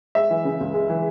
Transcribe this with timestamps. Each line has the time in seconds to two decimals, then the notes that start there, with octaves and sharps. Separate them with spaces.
0.15 G#3 E5
0.30 E3
0.45 C#3
0.60 C#2
0.74 G#3
0.90 E3